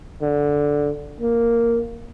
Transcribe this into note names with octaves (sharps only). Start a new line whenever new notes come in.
D3
A#3